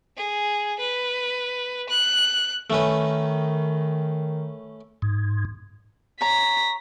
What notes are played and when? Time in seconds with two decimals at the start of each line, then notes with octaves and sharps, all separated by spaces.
0.17 G#4
0.79 B4
1.89 F#6
2.70 D#3 A3 C#4 B4
5.02 G#2
6.21 C#5 A#5 A#6 B6